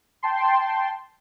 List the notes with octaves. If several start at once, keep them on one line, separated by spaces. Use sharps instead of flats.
G5 A5 C6